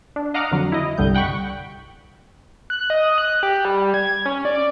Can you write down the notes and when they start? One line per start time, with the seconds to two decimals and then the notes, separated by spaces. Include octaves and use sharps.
0.16 D4
0.34 D#5 F5 F#5 A#5 D6 F6
0.51 F2 D3 F#3
0.72 E4 D#5
0.98 G1 C2 D3 G3 G6
1.14 F#5 G5 B5 C#6
2.70 F#6
2.90 D#5
3.18 F#6
3.43 G4
3.65 G3
3.94 G#6
4.26 C#4
4.45 D5